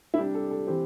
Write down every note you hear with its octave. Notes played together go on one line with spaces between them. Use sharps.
E4
C3 G3 D4 G4
A4
A4
C3 E3 C4 G4